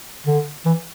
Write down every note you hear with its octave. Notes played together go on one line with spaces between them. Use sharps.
D3
E3